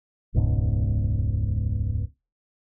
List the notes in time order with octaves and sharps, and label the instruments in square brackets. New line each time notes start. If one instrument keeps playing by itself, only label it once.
[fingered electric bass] E1 C#2 G#2 B2